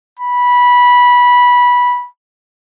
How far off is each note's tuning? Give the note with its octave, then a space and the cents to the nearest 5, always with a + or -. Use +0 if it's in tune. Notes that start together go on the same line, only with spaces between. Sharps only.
B5 -15